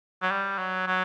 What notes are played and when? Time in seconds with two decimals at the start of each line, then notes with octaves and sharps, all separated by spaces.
0.22 F#3
0.31 G3
0.58 F#3
0.87 F#3